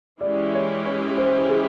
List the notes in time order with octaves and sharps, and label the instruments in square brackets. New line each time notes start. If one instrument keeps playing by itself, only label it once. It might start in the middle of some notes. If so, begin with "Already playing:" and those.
[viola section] E3 G#3 C#4 E4 G4 [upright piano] D5
[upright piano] C#5
C#5
C5
G#4